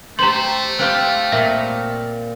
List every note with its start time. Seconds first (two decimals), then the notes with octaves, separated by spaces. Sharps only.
0.19 A3 G4 C5 A#5 C6
0.79 C4 F4 G4 F#6
1.32 A#2 E5